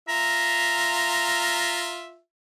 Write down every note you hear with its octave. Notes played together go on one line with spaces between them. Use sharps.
F4 E5 A#5